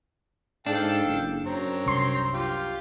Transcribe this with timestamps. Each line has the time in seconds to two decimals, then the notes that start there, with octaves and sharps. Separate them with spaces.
0.66 G#2 D4 A4 F5 G5
1.05 F#1
1.46 F#2 C4 C#5 A#5
1.86 C2 C6
2.34 F4 G4